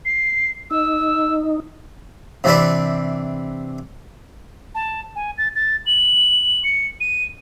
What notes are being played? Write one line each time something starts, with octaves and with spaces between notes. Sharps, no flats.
C7
D#4 E6
C3 E3 C4 D4 B4
A5
G#5
A6
A6
F#7
C#7
D#7